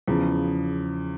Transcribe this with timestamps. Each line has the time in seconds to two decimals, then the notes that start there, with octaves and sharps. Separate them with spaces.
0.08 E2 C#3 F3